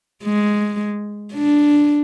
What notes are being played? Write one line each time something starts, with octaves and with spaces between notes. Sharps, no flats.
G#3
D4